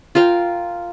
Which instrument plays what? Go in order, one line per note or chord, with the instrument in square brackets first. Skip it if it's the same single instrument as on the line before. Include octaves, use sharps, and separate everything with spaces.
[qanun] F4 A#4 F5 G5